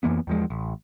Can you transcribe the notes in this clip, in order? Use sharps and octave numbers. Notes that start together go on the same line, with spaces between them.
F2 E3 A#3 B3
E2 F3 G#3
A1